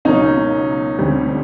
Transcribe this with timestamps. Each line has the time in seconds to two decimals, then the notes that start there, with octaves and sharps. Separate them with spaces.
0.05 C#2 B2 F#3 A#3 C#4 D#4
0.98 D2 D3 G3 C4